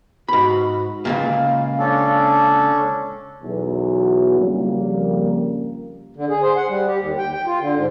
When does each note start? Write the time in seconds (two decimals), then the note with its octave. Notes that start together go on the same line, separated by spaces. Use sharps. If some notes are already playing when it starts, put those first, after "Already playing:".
0.29 G#2 F#4 B5
1.05 C#2 G2 A#2 F5
1.79 C#4 D4 A4
3.43 B1 E2 F#3
4.39 F2 C#3 G3 A#3
6.16 D3
6.30 G#4
6.42 C5
6.56 F#5
6.69 G3
6.87 G4
7.00 D#2
7.18 G5
7.33 G5
7.46 F4
7.60 D3
7.76 G#2